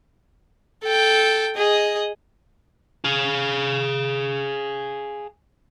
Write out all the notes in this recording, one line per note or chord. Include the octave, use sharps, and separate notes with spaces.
A4 G5
G#4 D#5
G#4 F5